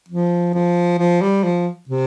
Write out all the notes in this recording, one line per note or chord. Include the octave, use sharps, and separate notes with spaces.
F3
F3
F3
G3
F3
C3